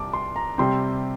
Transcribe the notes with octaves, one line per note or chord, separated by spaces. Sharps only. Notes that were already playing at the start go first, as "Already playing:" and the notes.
Already playing: C2 A5 D6
C6
A#5
C3 G3 C4 C6